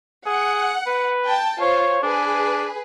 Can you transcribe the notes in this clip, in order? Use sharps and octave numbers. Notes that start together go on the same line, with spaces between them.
G#4 F#5
B4
G5 A5
F4 C5 C#5
D4 G#4 B4